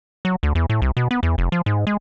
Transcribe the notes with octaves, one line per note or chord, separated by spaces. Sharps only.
F#3
D2
E2
A2
C2
B2
B3
E2
F1
F3
G#2
G#3